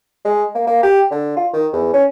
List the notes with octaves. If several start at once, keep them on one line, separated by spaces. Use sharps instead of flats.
G#3
A#3
A#3
G4
D3
F4
D#3
E2
C#4